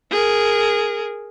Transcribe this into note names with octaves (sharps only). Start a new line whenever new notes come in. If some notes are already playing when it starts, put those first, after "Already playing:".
G#4 A#4